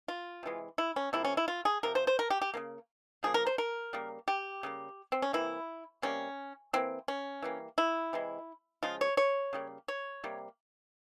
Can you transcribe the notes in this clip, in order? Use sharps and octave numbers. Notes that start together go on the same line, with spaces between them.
F4
C3 E3 G#3
E4
C#4
C3 F3 A#3 E4
C#4
E4
F4
G#4
C3 F3 A#4
C5
C5
A#4
G4
G4
C#3 F3 A#3
C#3 F3 A#3 G#4
A#4
C5
A#4
C#3 G3 A#3
G4
C#3 G3 A#3
C4
C#4
C3 E3 A#3 E4
C3 G3 A#3 C#4
E3 A#3 C4
C#4
E3 G3 A#3
E4
C3 E3 G#3
C#3 F3 G#3 F4
C#5
C#5
C#3 G3 A#3
C#5
C3 G3 A#3